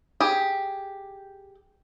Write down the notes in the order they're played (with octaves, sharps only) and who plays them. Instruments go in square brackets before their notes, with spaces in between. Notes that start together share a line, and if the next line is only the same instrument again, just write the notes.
[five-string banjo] G4 G#4